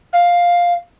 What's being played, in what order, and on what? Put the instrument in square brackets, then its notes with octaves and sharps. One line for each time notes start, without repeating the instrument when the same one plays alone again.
[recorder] F5